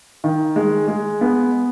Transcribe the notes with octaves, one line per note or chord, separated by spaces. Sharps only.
D#3
G#3
G#3
B3